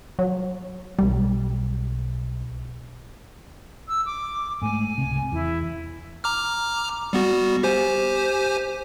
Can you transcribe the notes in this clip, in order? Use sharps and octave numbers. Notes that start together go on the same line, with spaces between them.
F#3
B1 G3
E6
D6
G#2 A3 G#5
C#2 C3
E2 E4
A#5 D6 F6
G3 B3 F#4
G4 C5 G#5